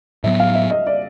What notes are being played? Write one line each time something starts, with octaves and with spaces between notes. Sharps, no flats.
A2 F#3 B3 E5
F5
E5
D#5
D5